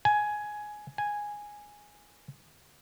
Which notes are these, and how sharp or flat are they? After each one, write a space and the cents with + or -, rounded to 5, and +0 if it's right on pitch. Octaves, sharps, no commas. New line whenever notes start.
G#5 +10
G#5 -5